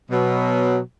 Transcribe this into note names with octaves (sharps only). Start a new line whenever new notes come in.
B2 F#3